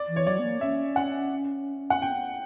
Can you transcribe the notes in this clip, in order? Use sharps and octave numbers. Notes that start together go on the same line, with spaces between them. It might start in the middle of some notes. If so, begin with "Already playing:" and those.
Already playing: D5
E3
C#5
F#3 D5
B3
A#3
C#4 E5
F#5
F#5
G5